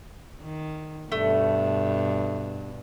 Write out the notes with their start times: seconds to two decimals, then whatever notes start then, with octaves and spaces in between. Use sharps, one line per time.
0.42 D#3
1.12 G2 B2 A3